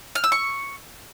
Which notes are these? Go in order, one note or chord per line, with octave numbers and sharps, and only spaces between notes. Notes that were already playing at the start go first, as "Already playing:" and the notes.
F6
E6
C#6